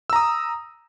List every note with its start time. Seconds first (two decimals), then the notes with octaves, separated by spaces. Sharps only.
0.10 E6
0.13 A#5
0.16 D#6